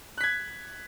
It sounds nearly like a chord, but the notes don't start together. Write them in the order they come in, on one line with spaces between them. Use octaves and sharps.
F#6 B6 G#6